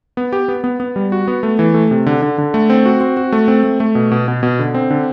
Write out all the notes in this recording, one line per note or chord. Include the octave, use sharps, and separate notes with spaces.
B3
G4
B3
B3
B3
G3
F#4
B3
A3
E3
A3
C3
D3
D3
D3
A3
C4
F#4
C4
F#4
A3
C4
A3
A3
B2
B2
B2
B2
D3
C4
D3